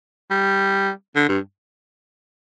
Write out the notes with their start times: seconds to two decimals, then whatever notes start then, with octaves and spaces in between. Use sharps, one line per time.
0.30 G3
1.16 D3
1.29 G2